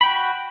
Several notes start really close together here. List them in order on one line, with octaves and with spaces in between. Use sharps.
B5 G5 F#4